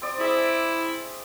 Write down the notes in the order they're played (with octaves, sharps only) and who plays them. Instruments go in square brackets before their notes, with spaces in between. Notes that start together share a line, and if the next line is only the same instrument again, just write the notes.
[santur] C4 D5 D#6
[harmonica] E4 [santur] G#4 E5